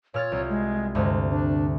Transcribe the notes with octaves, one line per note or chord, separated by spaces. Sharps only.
A#2 C#5 F6 A6
C2
G#3
D2 G2 C3 G#3
D4